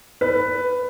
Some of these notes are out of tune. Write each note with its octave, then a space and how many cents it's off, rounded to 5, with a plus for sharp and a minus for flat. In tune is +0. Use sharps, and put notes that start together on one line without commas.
B4 +10